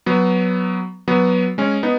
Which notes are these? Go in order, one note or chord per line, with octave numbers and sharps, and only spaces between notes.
F#3 B3
F#3 B3
G#3 C#4
B3 D#4